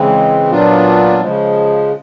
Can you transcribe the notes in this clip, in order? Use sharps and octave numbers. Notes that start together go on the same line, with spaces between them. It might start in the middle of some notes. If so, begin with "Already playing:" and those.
Already playing: C#3 E3 G#3 C4
A#2 F#3 B3 D4 F4
C#3 F3 G#3